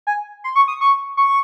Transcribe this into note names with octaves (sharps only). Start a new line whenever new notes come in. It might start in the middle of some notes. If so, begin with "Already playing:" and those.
G#5
C6
C#6
D#6
C#6
C#6